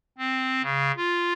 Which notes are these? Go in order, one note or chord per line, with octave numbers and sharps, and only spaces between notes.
C4
C#3
F4